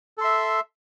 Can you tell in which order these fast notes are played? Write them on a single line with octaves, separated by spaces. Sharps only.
A4 C6 E5